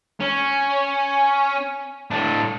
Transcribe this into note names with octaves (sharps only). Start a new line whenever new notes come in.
C#4
A2 D4